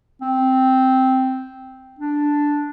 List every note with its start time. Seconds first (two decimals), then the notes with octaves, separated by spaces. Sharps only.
0.21 C4
1.99 D4